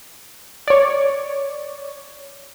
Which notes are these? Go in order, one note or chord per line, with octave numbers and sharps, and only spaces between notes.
C#5 D5